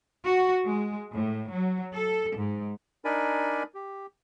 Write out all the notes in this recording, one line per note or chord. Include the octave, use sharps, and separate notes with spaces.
F#4
G#3
A2
F#3
A4
G#2
D4 D#4 A#4 D5 G#5 B5
G4